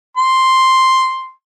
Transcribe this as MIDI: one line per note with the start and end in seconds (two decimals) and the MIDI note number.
0.17 1.31 84